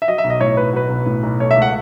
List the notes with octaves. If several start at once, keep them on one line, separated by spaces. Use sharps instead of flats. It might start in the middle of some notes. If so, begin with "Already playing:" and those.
E5
F#3 D#5
E5
B1
D#5
A2 C#5
B1 B4
F#3 B4
B1
A2
B1
A3 C#5
E5
C#2
F#5